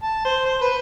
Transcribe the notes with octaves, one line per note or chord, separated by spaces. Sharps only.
A5
C5
C5
B4